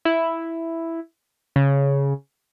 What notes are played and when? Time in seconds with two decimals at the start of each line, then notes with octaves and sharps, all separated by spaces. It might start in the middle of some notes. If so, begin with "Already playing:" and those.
0.05 E4
1.56 C#3